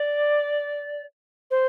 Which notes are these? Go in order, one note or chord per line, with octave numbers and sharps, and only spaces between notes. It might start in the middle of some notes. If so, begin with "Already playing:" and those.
Already playing: D5
C5